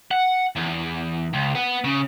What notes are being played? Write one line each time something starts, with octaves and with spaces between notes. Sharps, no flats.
F#5
E2
C#2
B3
C#3